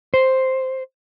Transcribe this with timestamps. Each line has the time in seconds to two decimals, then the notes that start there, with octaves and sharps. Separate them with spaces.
0.14 C5